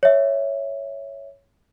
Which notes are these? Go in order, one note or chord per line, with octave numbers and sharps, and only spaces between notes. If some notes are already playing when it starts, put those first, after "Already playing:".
C#5 E5